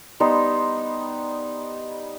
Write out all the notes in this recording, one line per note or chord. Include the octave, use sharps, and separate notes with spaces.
G3 B3 D#4 C5